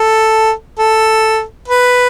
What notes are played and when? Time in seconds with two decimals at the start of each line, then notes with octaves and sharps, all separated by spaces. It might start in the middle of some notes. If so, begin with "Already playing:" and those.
Already playing: A4
0.79 A4
1.68 B4